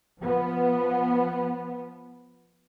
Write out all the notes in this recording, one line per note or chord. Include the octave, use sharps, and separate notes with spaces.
F3 B3